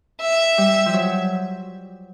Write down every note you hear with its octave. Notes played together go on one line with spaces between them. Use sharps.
E5
G3
F3
F#3